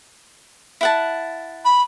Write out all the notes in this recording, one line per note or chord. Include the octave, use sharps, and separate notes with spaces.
E4 F#5 A5
B5